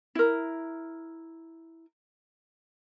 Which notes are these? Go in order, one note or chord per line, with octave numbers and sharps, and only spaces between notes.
E4 A#4